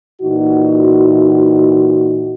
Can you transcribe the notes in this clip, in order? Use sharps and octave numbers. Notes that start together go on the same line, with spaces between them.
A#2 E3 D#4 F#4